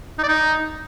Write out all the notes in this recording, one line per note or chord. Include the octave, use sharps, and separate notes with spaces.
D#4
D5
D#4